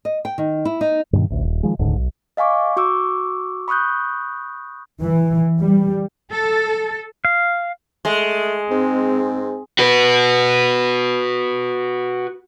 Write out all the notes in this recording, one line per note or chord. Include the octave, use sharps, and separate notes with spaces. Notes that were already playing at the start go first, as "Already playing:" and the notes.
D#5
G5
D#3
E4
D#4
G2 B2 D3 D#3
A1 D2
D#1
D#3 F3 G#3
D#1 C#2 G#2 D3
B1
D#5 F5 G#5 C#6 D6
F#4 C#6 D6 E6
B5 C#6 D#6 F#6 G6
E3
G3
A4
F5
G#3 A3
G#2 C4
F#4 B4